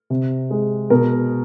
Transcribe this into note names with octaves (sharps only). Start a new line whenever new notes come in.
C3
G#3
B2 A#4